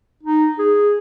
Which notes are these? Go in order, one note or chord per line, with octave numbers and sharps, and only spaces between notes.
D#4
G#4